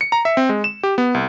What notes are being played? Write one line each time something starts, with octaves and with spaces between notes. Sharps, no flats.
C#7
A#5
E5
C4
G#3
E7
G4
B3
C2